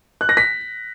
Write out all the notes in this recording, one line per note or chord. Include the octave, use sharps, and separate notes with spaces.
F#6
A#6
B6